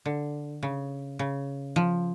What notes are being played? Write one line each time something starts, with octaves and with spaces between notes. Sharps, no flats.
D3
C#3
C#3
F3